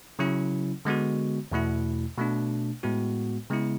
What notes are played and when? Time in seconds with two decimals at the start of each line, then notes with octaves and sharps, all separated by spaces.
0.19 C#3 F#3 C#4 E4
0.85 D3 G#3 B3 F#4
1.52 E2 B2 A3 E4
2.17 B2 A3 D4
2.83 A2 G#3 B3 F#4
3.50 C#3 G#3 B3 E4